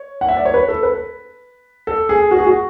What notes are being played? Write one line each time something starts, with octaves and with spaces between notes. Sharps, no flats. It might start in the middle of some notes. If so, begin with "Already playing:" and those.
Already playing: C#5
F#5
E5
D5
C#5
B4
A4
B4
A4
G#4
F#4
G#4
F#4